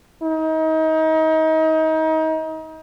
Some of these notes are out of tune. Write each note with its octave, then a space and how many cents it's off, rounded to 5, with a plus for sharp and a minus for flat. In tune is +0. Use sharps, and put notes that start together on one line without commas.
D#4 +30